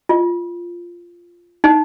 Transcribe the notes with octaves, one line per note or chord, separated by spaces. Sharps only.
F4
D#4